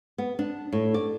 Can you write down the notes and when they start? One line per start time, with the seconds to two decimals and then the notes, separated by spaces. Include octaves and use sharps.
0.18 B3
0.39 D4
0.72 A2
0.94 D5